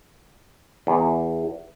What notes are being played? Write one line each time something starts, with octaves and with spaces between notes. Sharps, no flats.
E2